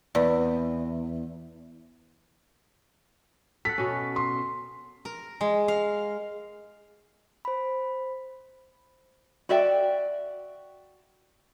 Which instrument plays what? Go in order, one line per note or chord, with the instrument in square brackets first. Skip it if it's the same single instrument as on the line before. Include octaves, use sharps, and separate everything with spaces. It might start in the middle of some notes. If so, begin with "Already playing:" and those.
[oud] E2 [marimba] B4 D5
[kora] A4 F#5 [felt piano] B6
[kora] B2 C#4
[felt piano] C6
[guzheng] A#4
G#3
F5
[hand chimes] C5 B5
[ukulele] F#4 D5 E5 G5